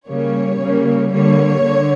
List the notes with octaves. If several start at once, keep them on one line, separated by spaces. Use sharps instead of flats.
C#3 G3 A#3 C#5
C#3 G3 A#3
D3 G3 A#3 C#5
D3